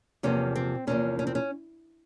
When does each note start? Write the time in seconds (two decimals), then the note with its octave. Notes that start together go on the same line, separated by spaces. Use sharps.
0.23 E2 C3 F3 A#3 C#4
0.55 C4
0.87 E2 C3 F3 A#3 C#4
1.19 C#4
1.27 C4
1.35 C#4